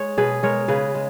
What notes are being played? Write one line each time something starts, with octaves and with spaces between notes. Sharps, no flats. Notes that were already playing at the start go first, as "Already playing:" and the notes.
Already playing: G#3 C#5
B2 G#4 B4
G#3 A#4 C#5
C#3 G#4 B4
G#3